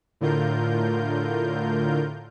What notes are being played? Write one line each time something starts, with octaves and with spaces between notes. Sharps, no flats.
A2 D3 F4 A#4 G6